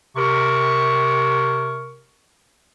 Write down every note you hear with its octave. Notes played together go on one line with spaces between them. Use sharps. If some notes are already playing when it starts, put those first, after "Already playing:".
C3 A#4 C#6